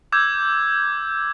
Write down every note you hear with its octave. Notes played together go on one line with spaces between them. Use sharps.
D6 E6 G6 G#6